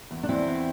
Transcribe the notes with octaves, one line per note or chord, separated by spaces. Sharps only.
E2
D4
E2 C4 E4
E2